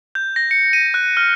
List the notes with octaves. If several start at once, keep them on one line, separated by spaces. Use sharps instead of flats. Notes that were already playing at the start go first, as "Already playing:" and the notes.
G6
A#6
C#7
D#7
F#6
F6